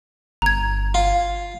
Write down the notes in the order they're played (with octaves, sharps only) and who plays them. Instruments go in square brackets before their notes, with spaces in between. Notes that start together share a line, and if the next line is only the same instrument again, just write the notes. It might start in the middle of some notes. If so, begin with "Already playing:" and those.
[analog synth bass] G1 [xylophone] A#5 G#6
[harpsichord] F4